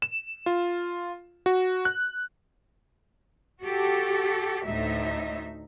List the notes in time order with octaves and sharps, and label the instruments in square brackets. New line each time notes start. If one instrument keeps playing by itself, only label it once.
[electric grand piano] E7
F4
F#4
F#6
[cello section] F#4 G4 A4
D2 A2 A3 D#4 E5